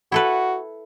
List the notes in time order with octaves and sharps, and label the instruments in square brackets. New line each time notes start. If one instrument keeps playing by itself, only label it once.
[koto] E4 A4 B4 [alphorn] F#4